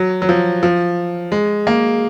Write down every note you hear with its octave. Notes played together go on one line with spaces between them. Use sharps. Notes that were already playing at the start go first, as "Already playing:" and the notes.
Already playing: F#3
F#3
F3
F3
G#3
A#3